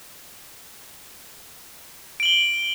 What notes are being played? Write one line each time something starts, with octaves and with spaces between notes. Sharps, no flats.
D7 F#7 G7